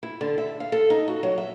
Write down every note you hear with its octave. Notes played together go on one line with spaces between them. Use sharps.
E4
D3
E5
F5
A4
D#4
F#4
F#3
E5